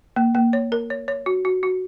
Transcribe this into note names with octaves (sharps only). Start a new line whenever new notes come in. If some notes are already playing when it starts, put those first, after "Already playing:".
A#3
A#3
C#5
A#4
C#5
C#5
F#4
F#4
F#4